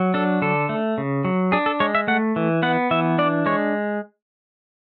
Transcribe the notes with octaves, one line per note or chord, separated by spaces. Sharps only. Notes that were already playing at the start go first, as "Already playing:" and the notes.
Already playing: F#3
D4 A4
D3 A4
A3
C#3
F#3
D4 G#4
A4
G#3 C#5
E5
A3 F#5
E3
B3 F#5
E3 E5
D4 D5
G#3 C#5